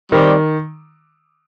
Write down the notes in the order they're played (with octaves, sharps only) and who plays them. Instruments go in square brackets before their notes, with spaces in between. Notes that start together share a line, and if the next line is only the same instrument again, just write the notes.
[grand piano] D#3 [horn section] G3 C4 G4 D5